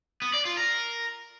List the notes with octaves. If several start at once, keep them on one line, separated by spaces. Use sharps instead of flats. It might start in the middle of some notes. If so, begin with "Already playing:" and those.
B3
D5
F4
A#4